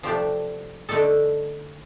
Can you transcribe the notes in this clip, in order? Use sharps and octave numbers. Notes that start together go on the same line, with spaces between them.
C3 F3 A3 D4 G4
D3 A3 D#4 A4